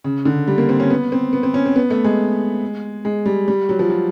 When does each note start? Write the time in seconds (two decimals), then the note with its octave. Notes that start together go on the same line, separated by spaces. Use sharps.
0.04 C#3
0.25 D3
0.48 G3
0.58 A#3
0.69 C4
0.80 C#4
0.90 B3
1.12 C4
1.33 B3
1.43 C4
1.54 C#4
1.65 C4
1.76 B3
1.90 A3
2.04 G#3
3.05 G#3
3.26 G3
3.48 G3
3.69 F#3
3.79 F3
3.90 F#3